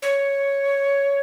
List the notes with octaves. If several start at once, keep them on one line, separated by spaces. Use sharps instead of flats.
C#5